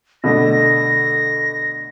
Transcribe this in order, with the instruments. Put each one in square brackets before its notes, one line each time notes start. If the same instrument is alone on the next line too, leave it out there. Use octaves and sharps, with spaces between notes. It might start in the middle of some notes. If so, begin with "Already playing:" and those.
[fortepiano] B2 D3 A3 [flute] A#6